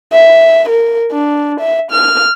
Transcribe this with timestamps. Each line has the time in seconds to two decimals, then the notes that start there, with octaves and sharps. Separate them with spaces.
0.13 E5
0.69 A#4
1.12 D4
1.60 E5
1.91 F6